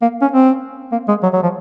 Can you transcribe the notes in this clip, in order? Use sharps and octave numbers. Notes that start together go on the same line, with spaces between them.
A#3
C#4
C4
A#3
G#3
F#3
F#3
F3